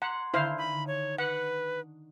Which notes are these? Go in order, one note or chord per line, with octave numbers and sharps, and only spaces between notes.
F#5 A#5 C6 G#6
D3 D#3 E4 C5 F5
B5 D#6
C#5
B4 F#5